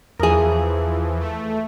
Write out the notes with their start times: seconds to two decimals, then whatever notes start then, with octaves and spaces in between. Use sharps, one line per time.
0.20 E2 E3 F3 G#4 A#4 D#6
1.20 A3